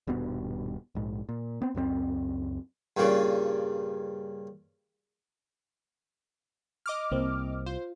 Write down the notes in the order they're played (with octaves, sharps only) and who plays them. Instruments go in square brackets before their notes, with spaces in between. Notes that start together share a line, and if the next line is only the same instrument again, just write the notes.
[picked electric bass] D#1 G2 B2 B3
A#1 G#2
A#2
B3 C4
C#2 F#2 G#3 C4
[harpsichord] G2 A#2 C#3
[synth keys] D#5 D6 F6
[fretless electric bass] C2 [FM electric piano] A#3 C4
[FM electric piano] F4 [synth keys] C5